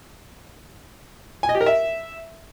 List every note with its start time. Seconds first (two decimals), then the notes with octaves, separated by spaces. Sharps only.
1.43 G#5
1.49 D#5
1.55 G4
1.61 A#4
1.66 E5